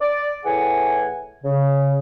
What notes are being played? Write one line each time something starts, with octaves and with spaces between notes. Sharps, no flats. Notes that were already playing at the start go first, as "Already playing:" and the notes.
D5
A2 E3 G#4 F#5 G#5
C#3